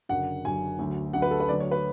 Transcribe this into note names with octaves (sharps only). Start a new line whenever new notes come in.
F#1 F#2 D3 F#5
F#1 F#2 D3 G#5
D2 D3 F#3
D2 D3 F#3 F#5
B4
A4
B4
D2 D3 F#3 D5
C#5
B4